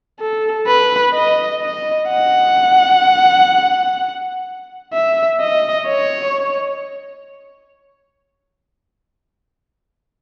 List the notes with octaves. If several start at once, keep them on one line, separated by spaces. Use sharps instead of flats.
A4
B4
D#5
D#5
F#5
E5
D#5
C#5